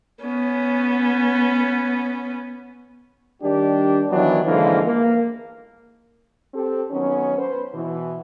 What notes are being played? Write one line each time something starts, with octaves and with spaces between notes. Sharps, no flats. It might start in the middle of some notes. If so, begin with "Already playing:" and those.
B3 C#4
D#3 G3 D4 G4
D#3 E3 F#3 B3 D4
G#2 D3 E3 F3 A#3
A#3
C4 G4 A4
D#3 F#3 B3 C#4
B4 C5
B2 E3